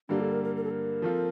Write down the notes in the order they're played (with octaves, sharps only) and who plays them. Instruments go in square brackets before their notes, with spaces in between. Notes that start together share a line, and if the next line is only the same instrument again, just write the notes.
[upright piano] G2 D3 G3 A#3 [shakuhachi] D4
[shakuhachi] A4
A#4
A#4
A#4
A4
A#4
[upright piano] F3 C4 F4 A4